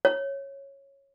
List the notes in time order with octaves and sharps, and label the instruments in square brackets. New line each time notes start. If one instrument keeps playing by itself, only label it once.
[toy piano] C#5